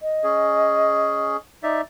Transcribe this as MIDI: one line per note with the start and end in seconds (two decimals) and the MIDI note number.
0.01 1.35 75
0.24 1.37 61
0.24 1.37 68
1.63 1.81 63
1.63 1.81 74
1.63 1.81 76